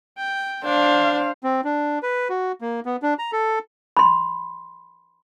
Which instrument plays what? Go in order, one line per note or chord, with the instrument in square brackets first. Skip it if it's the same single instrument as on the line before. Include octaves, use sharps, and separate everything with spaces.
[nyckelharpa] G5
[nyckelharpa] D4 [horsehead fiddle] C5 F5
[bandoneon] C4
D4
B4
F#4
A#3
B3
D4
A#5
A4
[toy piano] B5 C6